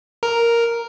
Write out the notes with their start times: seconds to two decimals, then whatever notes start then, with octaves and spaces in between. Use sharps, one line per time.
0.23 A#4